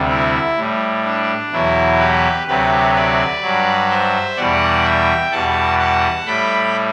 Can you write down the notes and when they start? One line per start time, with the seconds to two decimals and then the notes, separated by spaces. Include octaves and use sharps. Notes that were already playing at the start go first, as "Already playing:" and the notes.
Already playing: D2 C3 G3
0.10 E4
0.57 A2 G3
1.05 D4
1.52 E2 B2 F#3 E4
1.99 G4 B4
2.47 D2 C3 F#3 G4 B4
2.94 B4 D5
3.42 G2 F#3
3.90 C5 E5
4.37 E2 B2 G3 D5 F#5
4.84 E5 G5
5.32 E2 B2 G3 F#5 A5
5.79 F#5 A5
6.26 A2 G3 G5 B5